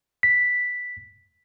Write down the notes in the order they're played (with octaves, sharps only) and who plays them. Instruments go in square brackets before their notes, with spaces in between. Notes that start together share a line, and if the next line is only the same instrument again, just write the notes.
[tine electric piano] B6